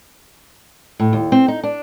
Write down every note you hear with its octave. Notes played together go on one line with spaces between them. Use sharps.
A2
D#2
C4
D#4
D4